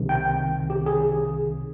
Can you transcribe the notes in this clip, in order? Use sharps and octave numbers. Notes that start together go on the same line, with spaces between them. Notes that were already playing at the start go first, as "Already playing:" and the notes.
Already playing: C2 C3 D#3
G5
G5
G4
G#4